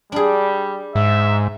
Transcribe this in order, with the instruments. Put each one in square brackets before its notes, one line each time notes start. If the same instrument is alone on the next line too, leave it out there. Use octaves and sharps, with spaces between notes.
[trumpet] G3 [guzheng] D4 G#4
[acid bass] G#2 [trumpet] E5